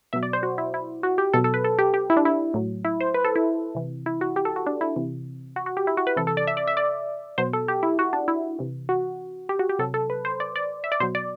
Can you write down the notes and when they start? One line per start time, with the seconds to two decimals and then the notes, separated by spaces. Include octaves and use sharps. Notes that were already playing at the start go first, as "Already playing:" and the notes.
0.13 B2 F#3 E5
0.23 D5
0.33 C5
0.43 F#4
0.58 E4
0.74 E4
1.03 F#4
1.18 G4
1.34 B2 F#3 A4
1.44 A4
1.54 B4
1.64 A4
1.78 G4
1.94 G4
2.10 E4
2.17 D4
2.25 E4
2.54 A2 F#3
2.85 E4
3.01 C5
3.14 B4
3.24 A4
3.36 E4
3.75 C3 E3
4.06 E4
4.21 F#4
4.36 G4
4.45 A4
4.56 F#4
4.66 D4
4.81 E4
4.96 C3 E3
5.56 F#4
5.66 F#4
5.77 G4
5.87 E4
5.97 F#4
6.07 B4
6.17 C3 E3 A4
6.27 A4
6.37 D5
6.47 E5
6.57 D5
6.67 E5
6.77 D5
7.38 B2 F#3 C5
7.53 A4
7.68 G4
7.83 E4
7.99 F#4
8.13 D4
8.28 E4
8.59 C3 E3
8.89 F#4
9.49 G4
9.59 F#4
9.69 G4
9.79 C3 F#3 A4
9.94 A4
10.10 B4
10.25 C5
10.40 D5
10.56 D5
10.84 E5
10.92 D5
11.00 B2 F#3 C5
11.15 D5